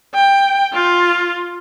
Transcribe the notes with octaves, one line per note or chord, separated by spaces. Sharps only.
G5
F4